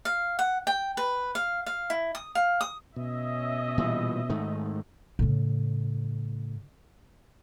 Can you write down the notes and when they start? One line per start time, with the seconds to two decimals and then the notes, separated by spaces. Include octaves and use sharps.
0.05 F5
0.39 F#5
0.67 G5
0.97 B4
1.35 F5
1.66 F5
1.90 E4
2.15 D#6
2.35 F5
2.61 D#6
2.96 B2 C#4 D#5 E5
3.78 A#2 E3 G3
4.29 G#2 D#3 A3
5.19 A2 C#3